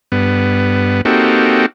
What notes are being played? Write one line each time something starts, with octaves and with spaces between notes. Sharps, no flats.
G2 B3
A#3 C4 D#4 F#4 G4 A4